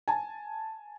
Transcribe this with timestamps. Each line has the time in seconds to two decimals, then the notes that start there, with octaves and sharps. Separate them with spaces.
0.08 G#5 A5